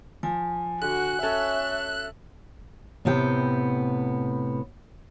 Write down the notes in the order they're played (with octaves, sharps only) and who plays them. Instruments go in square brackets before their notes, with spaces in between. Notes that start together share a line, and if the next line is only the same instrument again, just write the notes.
[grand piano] F3 [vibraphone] G#5
[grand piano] D3 [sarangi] F#4 [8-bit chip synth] F#6
[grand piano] C#4 A4 C#5 [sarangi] E5
[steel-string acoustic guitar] A2 C3 B3 G5